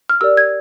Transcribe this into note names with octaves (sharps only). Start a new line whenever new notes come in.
F6
G4 A#4 D5 E6
G#6